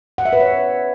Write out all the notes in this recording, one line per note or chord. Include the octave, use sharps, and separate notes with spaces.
F#5
E5
B4
C#5